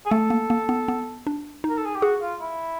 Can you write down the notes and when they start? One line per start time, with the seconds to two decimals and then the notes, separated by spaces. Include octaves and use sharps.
0.06 G#4
0.11 A3 A4
0.30 A#3
0.50 A#3
0.69 B3
0.88 B3
1.27 D4
1.64 D#4
1.70 A#4
1.78 A4
1.86 G#4
1.95 G4
2.02 F#4 G#4
2.21 F4
2.41 E4